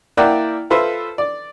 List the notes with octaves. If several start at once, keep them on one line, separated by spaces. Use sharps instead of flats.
A#3 E4 D5 F#5 G5 A#5
F4 A4 B4 C5 E5
D5